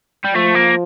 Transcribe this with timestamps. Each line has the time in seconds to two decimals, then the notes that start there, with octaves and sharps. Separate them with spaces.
0.24 G3
0.34 F3 A3
0.54 A#3